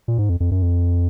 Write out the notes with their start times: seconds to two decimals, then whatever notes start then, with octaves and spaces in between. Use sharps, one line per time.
0.08 A#2
0.18 G#2
0.29 F2
0.40 F2
0.51 F#2
0.62 F2